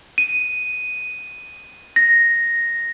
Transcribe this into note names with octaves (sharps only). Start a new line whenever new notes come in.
D#7
A#6